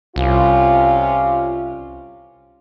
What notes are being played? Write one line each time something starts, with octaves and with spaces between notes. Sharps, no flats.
C2 C3 C#4 F4